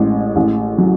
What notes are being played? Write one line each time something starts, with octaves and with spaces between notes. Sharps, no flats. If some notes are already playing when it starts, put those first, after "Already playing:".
Already playing: A1 G#3
A1
F#3